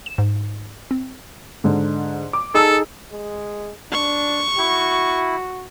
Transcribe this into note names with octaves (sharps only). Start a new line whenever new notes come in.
E7
G#2
C4
G#2 D3
D6
D#4 G#4 A4 A5 D#6 E6
G#3
D4 C#6
E4 F#4